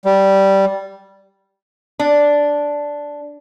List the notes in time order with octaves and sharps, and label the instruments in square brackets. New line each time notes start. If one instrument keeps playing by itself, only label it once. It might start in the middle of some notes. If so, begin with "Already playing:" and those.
[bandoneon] G3
[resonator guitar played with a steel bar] D4